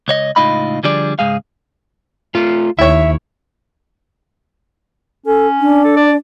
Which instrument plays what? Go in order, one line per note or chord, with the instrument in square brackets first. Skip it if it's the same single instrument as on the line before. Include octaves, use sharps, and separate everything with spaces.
[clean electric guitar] C#2 C#5 D#5
C#2 A2 D#4 F4 D#5 B5
D3 F3 G3 D4 G#4 D5
C#2 G#2 G#3 G#4 F5
[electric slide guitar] A3 F4
[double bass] D#2 [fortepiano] E4 C#5 [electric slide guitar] E5
[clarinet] C#4 [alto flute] A4
[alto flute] D4
[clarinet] A4
D5